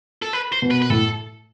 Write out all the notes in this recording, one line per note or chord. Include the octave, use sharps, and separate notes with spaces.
A4
B4
C5
B2
B4
B4
A2 A4